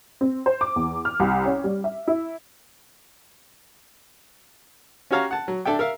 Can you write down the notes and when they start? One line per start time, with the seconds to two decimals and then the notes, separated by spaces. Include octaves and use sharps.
0.21 C4
0.46 C5
0.61 D6
0.76 E2
1.05 F6
1.20 C2
1.46 C#4
1.64 G3
1.84 E5
2.08 E4
5.11 C#4 F#4 G4 C#5 F5 A#5
5.31 F#5 A5
5.48 F#3
5.65 D4 A4 E5 G5
5.79 A#4 E5 F5